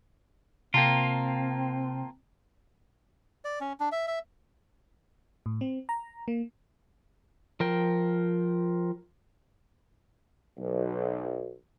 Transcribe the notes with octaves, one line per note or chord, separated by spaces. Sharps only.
C3 A#3 C4 F4 G5 A5 A#5
D5
C#4
D4
E5
E5
A2
C4
A#5
A#3
F3 A#4 G5
B1